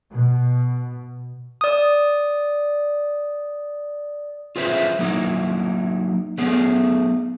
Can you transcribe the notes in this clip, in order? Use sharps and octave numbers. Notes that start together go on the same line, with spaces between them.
B2
D5 D#6
F4 G#4 B4 C5 E5
F#3 A#3 D#4 E4
F#3 A3 B3 G#4